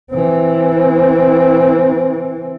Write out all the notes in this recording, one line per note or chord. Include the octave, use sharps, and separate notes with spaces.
E3 C4